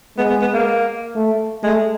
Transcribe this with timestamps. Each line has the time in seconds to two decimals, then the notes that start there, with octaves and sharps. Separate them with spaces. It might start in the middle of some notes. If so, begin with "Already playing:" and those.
0.17 G#3 B3
0.30 B3
0.41 B3
0.54 A#3
1.15 A3
1.63 G#3 A3